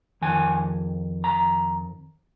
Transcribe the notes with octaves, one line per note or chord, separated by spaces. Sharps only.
F2 D#3 G#5
A#5